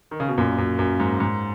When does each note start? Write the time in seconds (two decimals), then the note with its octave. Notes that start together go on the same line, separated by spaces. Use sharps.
0.11 D#3
0.20 C#3
0.28 B2
0.38 F#2 A#2
0.58 F#2
0.79 F#2
1.00 G#2
1.20 G#2